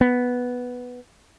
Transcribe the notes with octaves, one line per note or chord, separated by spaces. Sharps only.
B3